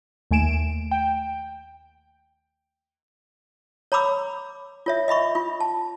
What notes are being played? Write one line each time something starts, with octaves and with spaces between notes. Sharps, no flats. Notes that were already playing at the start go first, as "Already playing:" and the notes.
D#2 A3 G#5 D7 E7
G5
C#5 A#5 B5 D6 E6
F4 C#5 E5
D#5 E5 B5 C#6
F4
A5